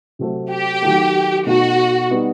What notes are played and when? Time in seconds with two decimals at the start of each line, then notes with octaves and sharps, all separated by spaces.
0.19 C3 F#3 A3 C4
0.51 G4
0.82 D#3 F#3 A3
1.46 B2 A3 D#4 F#4
2.10 G3 B3 D#4